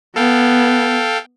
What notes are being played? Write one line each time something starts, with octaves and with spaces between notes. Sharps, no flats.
B3 A4 F5 G5